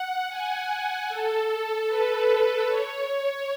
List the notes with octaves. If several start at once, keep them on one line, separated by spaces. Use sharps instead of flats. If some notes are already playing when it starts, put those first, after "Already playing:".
Already playing: F#5
G#5
A4
B4
C#5